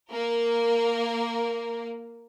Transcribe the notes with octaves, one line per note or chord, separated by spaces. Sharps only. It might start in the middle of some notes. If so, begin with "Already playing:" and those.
A#3 A#4